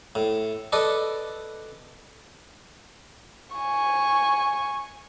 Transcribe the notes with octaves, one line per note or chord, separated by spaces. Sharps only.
A2
A4 B4 D5 D#5
G#5 C#6